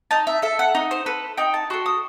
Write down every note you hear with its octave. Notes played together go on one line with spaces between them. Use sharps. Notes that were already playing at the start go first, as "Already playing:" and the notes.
D#4 A5
E5
A4 E5
F#5
D#4
C5
A4 B4
D#4 G5
A5
F#4 A4 C6
D#6